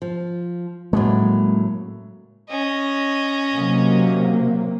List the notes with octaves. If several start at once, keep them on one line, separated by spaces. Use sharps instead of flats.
F3
A2 C#3 F#3 G#3 A#3
C#4 D#5
C3 F#3 A#3